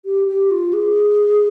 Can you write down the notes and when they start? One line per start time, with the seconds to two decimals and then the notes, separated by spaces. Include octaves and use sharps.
0.05 G4
0.27 G4
0.51 F4
0.73 G#4